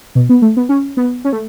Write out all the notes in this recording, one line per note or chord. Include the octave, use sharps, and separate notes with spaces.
B2
B3
A3
B3
C#4
B3
C#4
A3